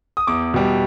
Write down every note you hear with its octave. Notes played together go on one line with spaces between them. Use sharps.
D#6
E2 D6
B2 G3